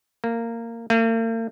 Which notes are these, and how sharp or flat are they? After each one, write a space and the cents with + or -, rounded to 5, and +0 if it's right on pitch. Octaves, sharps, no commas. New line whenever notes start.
A#3 -15
A#3 -45